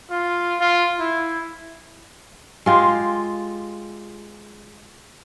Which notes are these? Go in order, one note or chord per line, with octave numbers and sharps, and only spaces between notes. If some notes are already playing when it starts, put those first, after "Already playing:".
F4
F4
E4
G#3 F4 G4